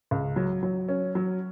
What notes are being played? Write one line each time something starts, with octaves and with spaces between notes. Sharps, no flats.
C#2
F#3
F#3
C#4
F#3